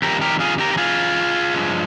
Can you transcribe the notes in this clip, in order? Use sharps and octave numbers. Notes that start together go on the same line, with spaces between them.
F2 D#3 G3 G4 A#4
G4 A#4
F4 G#4
G4 A#4
A#4
F4 G#4
G2 F3 G#3